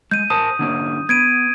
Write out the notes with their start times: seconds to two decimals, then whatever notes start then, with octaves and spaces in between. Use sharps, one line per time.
0.11 G#3 G6 D#7
0.30 A#4 C5 A5 D#6
0.59 D3 A#3 C#4
1.09 B3 G#6 D7 D#7